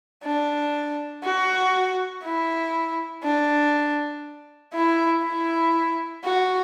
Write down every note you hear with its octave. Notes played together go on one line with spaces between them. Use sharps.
D4
F#4
E4
D4
E4
E4
F#4